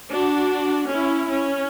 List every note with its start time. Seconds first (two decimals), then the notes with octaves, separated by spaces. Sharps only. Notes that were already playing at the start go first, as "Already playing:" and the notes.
0.11 D4 F#4
0.90 C#4 E4
1.30 C#4